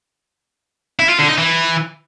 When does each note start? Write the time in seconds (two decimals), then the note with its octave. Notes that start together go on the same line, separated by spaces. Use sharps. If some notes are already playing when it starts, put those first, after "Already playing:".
0.99 E4
1.09 F4
1.19 D3
1.28 D#4
1.38 E3